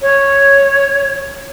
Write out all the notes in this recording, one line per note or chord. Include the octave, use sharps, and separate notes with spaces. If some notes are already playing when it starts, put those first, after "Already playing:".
C#5